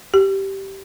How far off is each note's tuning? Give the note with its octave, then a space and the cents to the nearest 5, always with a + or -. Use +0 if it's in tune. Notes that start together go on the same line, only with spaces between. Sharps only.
G4 -15